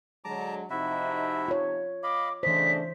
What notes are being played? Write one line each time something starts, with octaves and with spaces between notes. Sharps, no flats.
D3 F#3 G#3 A5 A#5 D6
C3 F3 D#4 E4 F#4 E5
F4 C#5
D#5 F5 B5 D6
C#3 E3 A3 D4 C5 D#5 B6